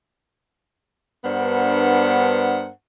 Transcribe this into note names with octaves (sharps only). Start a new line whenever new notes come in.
G2 B3 D4 A#4 C5 F#5